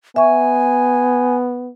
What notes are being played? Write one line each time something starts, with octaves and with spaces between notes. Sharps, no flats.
B3 E5 G#5 C#6